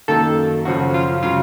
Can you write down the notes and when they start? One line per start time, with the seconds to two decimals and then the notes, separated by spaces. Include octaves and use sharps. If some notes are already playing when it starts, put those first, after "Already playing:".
0.08 F#2 D#3 A#3 A4
0.65 F#2 C#3 F3 F#4
0.94 F4
1.23 C#3 F#3 F4